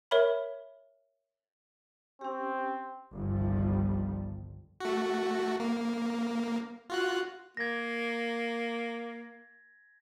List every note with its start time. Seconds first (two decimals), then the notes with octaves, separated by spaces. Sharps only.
0.11 A#4 C#5 E5 B5
2.21 C4 C#4 G4
3.14 G1 C2 D#3 F3 G3
4.80 A3 F#4
5.60 A#3
6.90 F4 F#4 F#6
7.57 A#3 G#6 A#6